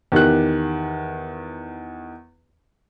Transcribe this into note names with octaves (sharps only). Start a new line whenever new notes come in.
E2 D#3 G4 F#6